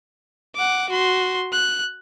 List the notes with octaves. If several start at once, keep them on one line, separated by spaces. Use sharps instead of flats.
F#5 D6
F#4 C6
F#6